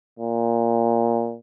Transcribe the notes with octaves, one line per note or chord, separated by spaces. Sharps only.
A#2